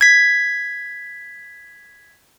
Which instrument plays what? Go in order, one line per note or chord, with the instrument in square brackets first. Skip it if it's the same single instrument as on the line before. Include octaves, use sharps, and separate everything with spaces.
[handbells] G#6 B6